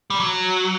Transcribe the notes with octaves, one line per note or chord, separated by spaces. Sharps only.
G3
F#3